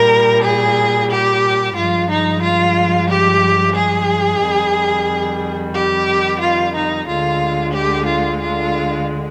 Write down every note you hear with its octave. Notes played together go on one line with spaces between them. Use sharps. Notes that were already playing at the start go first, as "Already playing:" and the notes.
Already playing: A#2 G3 A#4
G#4
G4
G2 F3 G#3 F4
D#4
F4
G4
G#4
F2 D#3 G3
G4
F4
D#4
D2 D3 G#3 F4
G4
F4
F4